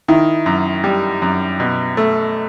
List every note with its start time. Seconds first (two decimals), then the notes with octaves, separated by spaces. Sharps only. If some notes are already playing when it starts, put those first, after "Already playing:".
0.08 D#3 E4
0.46 F#2
0.84 G3
1.22 F#2
1.60 B2
1.97 A3